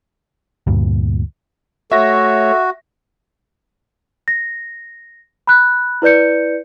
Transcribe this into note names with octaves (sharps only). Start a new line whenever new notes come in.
D2 G2 A#2
A3 F#4 C#5 E5 A#6
A#6
B5 F#6
E4 B4 D5 G6 C#7